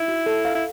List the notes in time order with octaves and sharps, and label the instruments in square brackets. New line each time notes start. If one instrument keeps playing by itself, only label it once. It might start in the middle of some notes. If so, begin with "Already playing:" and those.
Already playing: [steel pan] D#4 [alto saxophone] E4
[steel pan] F#4
A4
F5
[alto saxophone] E4